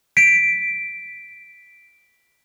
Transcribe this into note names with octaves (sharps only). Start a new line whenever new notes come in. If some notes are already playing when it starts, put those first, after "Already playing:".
B6 D7